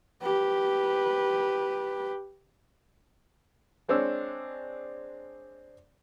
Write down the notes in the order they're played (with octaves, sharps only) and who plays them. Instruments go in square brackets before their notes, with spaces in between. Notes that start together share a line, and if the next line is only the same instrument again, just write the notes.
[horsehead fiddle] G4 B4
[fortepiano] G#3 C4 D4 C#5 E6